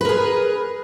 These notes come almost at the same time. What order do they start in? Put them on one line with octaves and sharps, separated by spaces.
B4 A#4 G#4